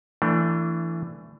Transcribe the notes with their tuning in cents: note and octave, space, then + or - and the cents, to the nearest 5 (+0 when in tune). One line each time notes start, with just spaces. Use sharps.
E3 +15 A3 +30 D4 +0